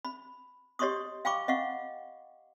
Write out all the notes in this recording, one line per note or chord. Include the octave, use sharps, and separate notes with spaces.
B5
G4 C#5 D#5 C6 C#6 D#6
F5 G5 B5 C#6 D6
D#5 F5 F#5 C#6